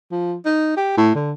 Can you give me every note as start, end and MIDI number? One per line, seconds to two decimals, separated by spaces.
0.11 0.35 53
0.45 0.76 63
0.77 0.93 67
0.97 1.14 45
1.15 1.33 50